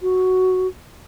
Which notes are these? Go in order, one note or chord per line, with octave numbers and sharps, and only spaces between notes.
F#4